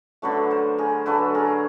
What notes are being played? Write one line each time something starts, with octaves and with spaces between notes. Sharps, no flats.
D3 F#3 A3 B4 C#5
A#4 C5
G#4 A#4
D3 F#3 A3 A4 B4
G#4 A#4